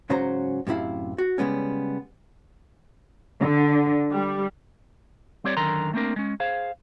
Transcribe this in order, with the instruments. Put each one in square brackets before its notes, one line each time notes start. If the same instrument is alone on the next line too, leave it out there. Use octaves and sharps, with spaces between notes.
[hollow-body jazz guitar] G#2 C#3 F#3 C#4 C5 A#5
F#2 A2 C3 E4 F5
F#4
C#3 G3 G#3 B3 C#4
[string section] D3
G3
[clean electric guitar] G3 C4 G4 C#5 D5
F#2 D3 D#3 A#4 A#5 C6
A3 A#3 C4 D4 A#4
G#3 C#4
G#4 C5 F5